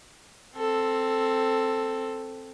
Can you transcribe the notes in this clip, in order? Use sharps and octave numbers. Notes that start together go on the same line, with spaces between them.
C4 A4